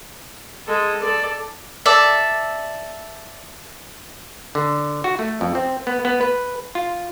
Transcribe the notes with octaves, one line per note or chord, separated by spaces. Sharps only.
G#3 A4
A4 D5
A4 D5 E5
D3
F#4
A3
F2
C4
B3
B3
B4
F4